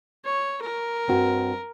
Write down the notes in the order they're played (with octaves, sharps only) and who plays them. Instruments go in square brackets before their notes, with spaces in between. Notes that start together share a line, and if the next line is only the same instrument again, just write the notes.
[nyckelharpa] C#5
A#4
[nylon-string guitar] G2 C4 F#4